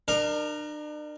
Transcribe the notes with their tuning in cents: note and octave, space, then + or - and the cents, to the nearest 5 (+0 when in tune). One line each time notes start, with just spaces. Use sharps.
D4 +40 A#4 +0